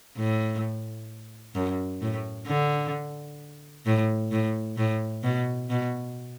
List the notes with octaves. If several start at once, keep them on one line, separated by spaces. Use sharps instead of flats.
A2
F#2
A2
D3
A2
A2
A2
B2
B2